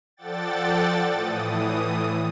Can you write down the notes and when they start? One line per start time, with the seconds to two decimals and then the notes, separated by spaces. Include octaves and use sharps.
0.17 F3 A4 D5 F#5 G5 A6
1.12 A2 E3 D#6